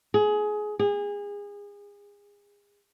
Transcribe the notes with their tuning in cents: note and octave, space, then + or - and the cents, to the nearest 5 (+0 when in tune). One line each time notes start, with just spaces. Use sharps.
G#4 +20
G#4 -30